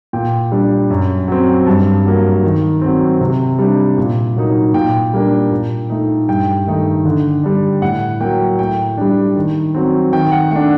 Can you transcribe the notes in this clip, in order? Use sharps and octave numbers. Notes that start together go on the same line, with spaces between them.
A#2 G5
G3 D4
F#2
F#3 C4
G2 A5
F#3 A#3
D#3
F#3 C4
C3
G3 D4
A#2
F#3 A#3 D#4
A#2 G5
G3 A#3 D4
A#2
A3 D#4
G2 G5
D#3 A3 D#4
D3
G3 D4
A2 F#5
F#3 A#3 G5
A2 G5
G3 D4
D#3
F#3 C4
D#3 G5
F#5
A3 D4 F#5